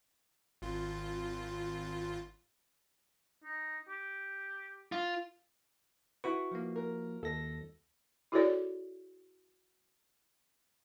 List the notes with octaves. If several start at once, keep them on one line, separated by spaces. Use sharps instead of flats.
G#1 F4
D#4
G4
F4
E4 F#4 B4 C#6
F3 A#3
A#4
D#2 A4 A#6
E4 F#4 G#4 A4 C#5 D5